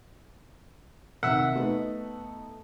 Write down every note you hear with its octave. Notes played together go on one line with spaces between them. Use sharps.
C3 D#3 E5 F#5
A3 B3 D#4